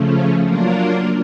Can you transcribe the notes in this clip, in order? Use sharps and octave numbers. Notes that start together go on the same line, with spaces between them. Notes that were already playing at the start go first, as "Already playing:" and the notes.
Already playing: C#3 F3 A3 C#4
F#3 A#3 D4 F4 A#4